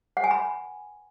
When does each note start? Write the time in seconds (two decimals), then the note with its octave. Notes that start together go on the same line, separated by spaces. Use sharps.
0.17 F#5
0.24 G#5
0.31 B5